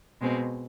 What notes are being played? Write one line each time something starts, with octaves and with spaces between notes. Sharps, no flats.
B2 G#3 C4